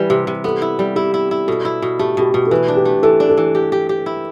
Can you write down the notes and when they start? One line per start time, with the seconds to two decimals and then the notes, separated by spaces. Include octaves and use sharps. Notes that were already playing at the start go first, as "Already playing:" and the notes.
Already playing: E3 G3 G4 B4
0.10 C3
0.27 C3
0.44 B3 A4
0.62 E4
0.79 G3
0.96 E4 G4
1.14 E4
1.31 E4
1.48 B2 A4
1.65 E4
1.82 B2
1.99 A3 G4
2.17 B2 G4
2.34 B2
2.47 A4
2.51 E3 B4
2.68 D4
2.76 G4
2.85 A3
3.03 E3 A4
3.20 D4
3.29 A4
3.37 E3
3.55 G4
3.72 G4
3.89 G4
4.06 E4